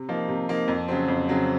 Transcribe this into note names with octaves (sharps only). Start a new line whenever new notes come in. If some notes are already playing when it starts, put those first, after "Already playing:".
Already playing: C3
F3 A#3 D#4
C3
F3 A#3 D#4
F2
C#3 F#3 C4
F2
C#3 F#3 C4